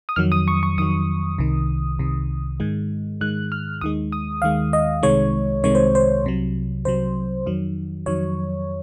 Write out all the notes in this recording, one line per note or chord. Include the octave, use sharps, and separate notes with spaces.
D#6
F2 D#3 F#3 F6
D#6
C#6
C#6
F2 D#3 F#3 D#6
C2 C3 D#3
C2 C3 D#3
G#2 D#3 G#3
G#2 D#3 G#3 F#6
F6
D#2 D#3 G#3 D#6
D#6
D#2 D#3 G#3 F5
D#5
C2 C3 D#3 G#3 C#5
C2 C3 D#3 G#3 C#5
C5
C5
C2 C3 F#3
C2 C3 F#3 C5
F2 D#3 F#3
F2 D#3 F#3 C#5